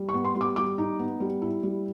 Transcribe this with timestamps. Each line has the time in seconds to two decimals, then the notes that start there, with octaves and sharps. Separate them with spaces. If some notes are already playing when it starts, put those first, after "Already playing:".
Already playing: G3
0.09 C#6
0.14 B3
0.25 C6
0.35 G3
0.41 D6
0.56 G3 D6
0.78 D#4
0.99 B3
1.20 G3
1.42 E4
1.63 G3